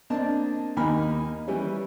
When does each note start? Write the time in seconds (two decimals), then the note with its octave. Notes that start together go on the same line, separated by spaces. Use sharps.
0.10 A#3 C4 D4 D#5 A5
0.76 D#2 A#3 D#4 G#5 B5 F6
1.47 E3 G3 C#4